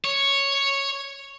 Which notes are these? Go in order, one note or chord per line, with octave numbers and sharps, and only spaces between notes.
C#5